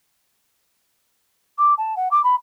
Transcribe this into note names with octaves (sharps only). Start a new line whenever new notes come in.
D6
A5
F#5
D6
B5